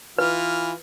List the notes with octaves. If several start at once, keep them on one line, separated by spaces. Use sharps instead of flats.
E3 F4 B4 F6